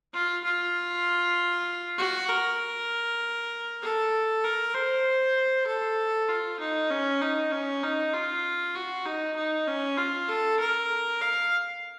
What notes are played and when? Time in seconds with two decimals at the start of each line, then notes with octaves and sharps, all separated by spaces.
0.13 F4
0.44 F4
1.98 F#4
2.29 A#4
3.82 A4
4.44 A#4
4.74 C5
5.67 A4
6.29 F4
6.60 D#4
6.90 C#4
7.21 D#4
7.51 C#4
7.83 D#4
8.13 F4
8.75 F#4
9.05 D#4
9.36 D#4
9.67 C#4
9.98 F4
10.29 A4
10.60 A#4
11.21 F5